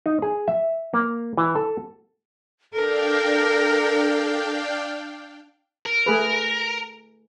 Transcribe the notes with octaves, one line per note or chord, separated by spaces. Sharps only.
D#4
G#4
E5
A#3
E3
A4
D4 A4 A#4 F5 G5
A#4
A3 G#4 B4